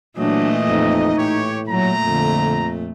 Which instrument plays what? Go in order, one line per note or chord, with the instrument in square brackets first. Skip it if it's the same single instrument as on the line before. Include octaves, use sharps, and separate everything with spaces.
[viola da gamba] A#2 E3 A3 [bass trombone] F#3 [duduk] D4 [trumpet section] D#5
[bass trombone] F2 [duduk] D#4
[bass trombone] A2 [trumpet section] G4 C#5
[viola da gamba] A#2 A3 [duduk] F#3 [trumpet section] A#5
[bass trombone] F2 [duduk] D3